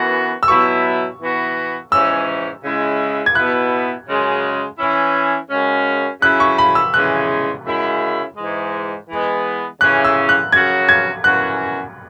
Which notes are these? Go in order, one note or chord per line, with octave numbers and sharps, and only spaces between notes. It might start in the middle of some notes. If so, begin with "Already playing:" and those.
Already playing: F#2 E3 B3 F#4
E6
B2 F#3 B3 E4 C#6
E3 B3 F#4
G#2 E3 C#4 E6
C#3 G#3 E4
G#6
B2 B3 E4 F#6
F#2 C#3 G#3
E3 C#4 E4
F#2 C#3 G#3 C#4
C#3 F#3 C#4 E4 F#6
C#6
B5
E6
C#3 E3 G#3 F#6
F#2 C#3 G#3 E4
G#2 E3 G#3
E3 G#3 B3
C#3 E3 C#4 F#6
E6
F#6
F#2 C#3 F#3 C#4 F#4 G#6
G#6
F#2 E3 C#4 F#4 F#6